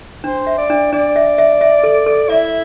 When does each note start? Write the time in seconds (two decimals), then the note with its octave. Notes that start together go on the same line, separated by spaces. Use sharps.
0.24 D4 C5
0.47 E5
0.58 D5
0.70 D4
0.93 D4 D5
1.16 E5
1.38 E5
1.61 E5
1.83 A4
2.06 A4
2.29 E4 E5